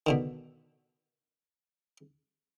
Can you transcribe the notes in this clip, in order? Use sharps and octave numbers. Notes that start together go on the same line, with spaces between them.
B2 D3 D#3